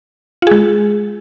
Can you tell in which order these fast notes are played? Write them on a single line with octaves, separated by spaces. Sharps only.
F4 G#4 G#3